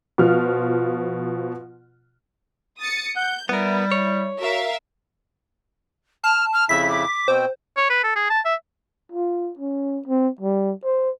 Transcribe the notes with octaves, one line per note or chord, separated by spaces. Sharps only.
B2 F3 F4 F6
D#6 A6 C#7
F#5 G6
G3 B3 E4 A#4
C#5
F#4 A#4 E5 F5
A5 F6
F6
F2 C#3 E4 E5 B6
D6
B2 C4 C5 G5
C#5
B4
A4
G#4
A5
E5
F4
C#4
C4
G3
C5